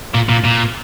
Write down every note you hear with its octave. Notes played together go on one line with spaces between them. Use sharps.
A#2
A#2
A#2